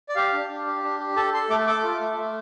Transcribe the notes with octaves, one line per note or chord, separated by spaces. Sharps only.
D5
G4 F5
D4
D4
G4
D4
G4
A4 A5
A4 C6
A3 D6
A4 D6
F4
A3
A3